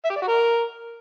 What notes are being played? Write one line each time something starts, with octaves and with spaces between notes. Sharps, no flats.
E5
G4
D5
F#4
A#4